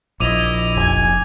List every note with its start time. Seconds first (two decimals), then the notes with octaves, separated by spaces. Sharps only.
0.20 A#1 E4 D#5 D6 D#7 F7
0.77 F1 G#5